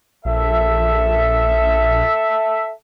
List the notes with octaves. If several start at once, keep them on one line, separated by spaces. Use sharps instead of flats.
A#1 A4 E5